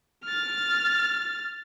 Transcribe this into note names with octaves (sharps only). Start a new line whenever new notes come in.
F6 A6